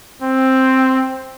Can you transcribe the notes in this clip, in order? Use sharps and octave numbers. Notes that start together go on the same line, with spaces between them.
C4